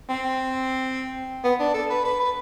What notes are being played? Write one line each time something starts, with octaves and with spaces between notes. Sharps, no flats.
C4
B3
D4
A4
B4
B4
B4